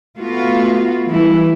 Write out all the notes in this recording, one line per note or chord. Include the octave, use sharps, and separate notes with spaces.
A3 B3 F4 F#4
E3 G3 A3 E4